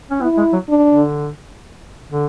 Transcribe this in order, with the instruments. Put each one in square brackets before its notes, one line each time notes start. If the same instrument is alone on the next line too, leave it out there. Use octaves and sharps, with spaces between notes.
[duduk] C#4
[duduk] B3 [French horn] E4
[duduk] G#3
F#3
[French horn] D4
[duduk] D3
D3